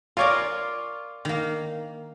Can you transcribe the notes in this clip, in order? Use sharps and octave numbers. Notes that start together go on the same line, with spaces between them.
F4 A#4 C#5 D5 G#5 A#5
D#3 A#3